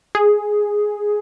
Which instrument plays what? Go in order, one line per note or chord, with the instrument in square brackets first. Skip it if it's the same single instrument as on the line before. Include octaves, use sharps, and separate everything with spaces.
[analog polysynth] G#4